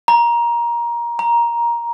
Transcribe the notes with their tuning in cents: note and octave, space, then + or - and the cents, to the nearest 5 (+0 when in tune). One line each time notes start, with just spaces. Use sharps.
A#5 +20
A#5 +10